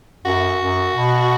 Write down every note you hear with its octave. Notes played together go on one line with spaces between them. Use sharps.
F#2 F#4
F#2
B2